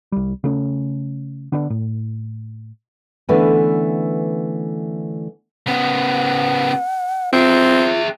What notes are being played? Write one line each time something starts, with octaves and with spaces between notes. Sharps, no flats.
C2 G3
C#3 A3 C#4
D3 B3 D4
A2
D3 E3 A3 B3 C#4 B4
C#3 B3 F#5
C4 F4 G#4 E5